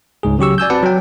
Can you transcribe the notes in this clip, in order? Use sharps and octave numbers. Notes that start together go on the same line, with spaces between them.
C#2 G#2 G#4
C#3 F#3 G4 C#6 E6
D5 G#5 E6 G6
C4 F#4 B4 D5 F#5 A5
F#3 G5